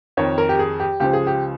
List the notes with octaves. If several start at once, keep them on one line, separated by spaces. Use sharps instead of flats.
F2 D#3 C#5
A#4
G4
G#4
G4
C#2 C#3 F3 G4
G#4
G4